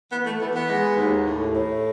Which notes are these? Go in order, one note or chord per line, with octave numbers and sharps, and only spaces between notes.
E3 B3
A3
E3 B3
B3
G#3
D#2
A2
A2